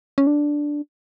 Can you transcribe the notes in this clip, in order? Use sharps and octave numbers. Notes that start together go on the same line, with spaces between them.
C#4
D4